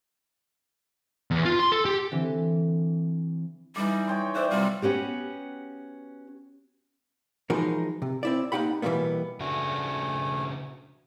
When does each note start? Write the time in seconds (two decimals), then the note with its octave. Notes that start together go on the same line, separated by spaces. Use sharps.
1.31 E2
1.45 F4
1.59 C6
1.72 A4
1.85 G4
2.11 D3 E3 C4
3.76 E3 G3 D#4 D6
4.08 C#5 G5 C6
4.35 C5 D5 E5 F#5
4.51 C3 G3 F4
4.82 B3 C#4 F#4 G4
7.50 E3 F3 G#3 D#4 F#4 A#4
8.02 C3
8.23 C4 E4 D5
8.52 A#3 D#4 G4 F#5 B5
8.82 B2 E3 G3 G#3 A#3 B3
9.40 C#3 A3 D4 F#4 G#5